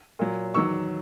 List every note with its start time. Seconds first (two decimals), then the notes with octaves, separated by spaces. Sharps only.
0.19 A#2 F#3
0.54 E2 D#3 F#3 C#6 E6